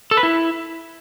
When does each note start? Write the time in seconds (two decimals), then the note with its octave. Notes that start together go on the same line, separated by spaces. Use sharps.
0.11 A4
0.17 B4
0.23 E4